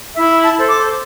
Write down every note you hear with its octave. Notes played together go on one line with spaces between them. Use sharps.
E4 E5
A5
A4 C5
D6